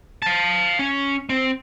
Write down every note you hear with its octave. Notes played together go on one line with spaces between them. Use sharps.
F5 A5
C#4
C4